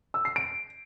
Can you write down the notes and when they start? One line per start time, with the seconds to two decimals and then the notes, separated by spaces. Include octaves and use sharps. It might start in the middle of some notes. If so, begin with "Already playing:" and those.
0.14 E6
0.25 C7
0.36 D7